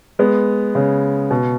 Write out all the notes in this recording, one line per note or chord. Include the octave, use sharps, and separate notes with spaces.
G#3 B3
C#3
B2